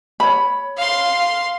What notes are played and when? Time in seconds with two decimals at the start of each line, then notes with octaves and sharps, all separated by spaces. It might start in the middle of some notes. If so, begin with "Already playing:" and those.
0.20 C#5 B5
0.77 F5 C6